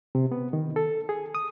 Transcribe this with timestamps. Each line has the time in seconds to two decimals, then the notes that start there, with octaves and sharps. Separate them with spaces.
0.15 C3
0.32 B3
0.53 D#3
0.76 A4
1.09 G#4
1.35 D#6